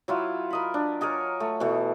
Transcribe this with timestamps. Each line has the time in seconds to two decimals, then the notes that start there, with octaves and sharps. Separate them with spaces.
0.08 F#3 E4 F4
0.50 A#4 D#5 B5
0.74 D4
1.01 A#4 C#5 D#5 G#5
1.40 A3
1.60 B2 E3 A3